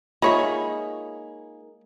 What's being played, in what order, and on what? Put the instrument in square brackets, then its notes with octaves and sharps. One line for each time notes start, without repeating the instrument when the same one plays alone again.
[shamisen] G#3 C#5 E5 [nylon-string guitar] A#3 D#4 G#4 [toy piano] F4